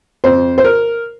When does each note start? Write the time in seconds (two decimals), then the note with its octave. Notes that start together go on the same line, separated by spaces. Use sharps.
0.24 F2 C5
0.58 C5
0.64 A#4